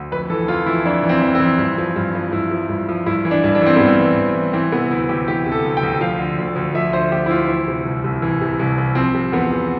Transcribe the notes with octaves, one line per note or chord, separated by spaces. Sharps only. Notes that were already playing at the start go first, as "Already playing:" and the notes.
Already playing: D2
F2 B4
E3 A4
F2 F4
E3 E4
F2 D4
E3
C4
F2
C4
E3
G2
F3
G2
F3
G2 E4
F3
G2
F3
G2 E4
E3
D4
G2
D4
E3 C4
G2 B3
C4
E3
G2
E3
E3 C4
C3 B3
D2 E4
D2 G4
E3 G4
C3
A4
D2
G5
D2
F3 F5
D3
D2
D2
F3 E5
D3 C5
D2 G4
E4
D2 F4
E3 E4
C3
C2
C2
E3
C3
C2
C2
F3 C4
C3
E2 B3
E2